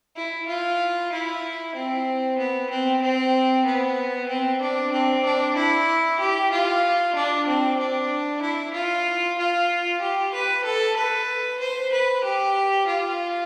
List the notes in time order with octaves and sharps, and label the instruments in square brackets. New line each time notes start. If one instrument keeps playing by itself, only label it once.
[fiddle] E4
F4
E4
C4
B3
C4
C4
B3
C4
D4
C4
D4
E4
G4
F4
D4
C4
D4
E4
F4
F4
G4
B4
A4
B4
C5
B4
G4
F4